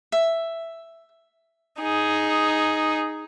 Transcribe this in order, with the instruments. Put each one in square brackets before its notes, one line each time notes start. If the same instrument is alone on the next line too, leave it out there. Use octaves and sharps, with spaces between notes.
[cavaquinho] E5
[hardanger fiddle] D#4 G#4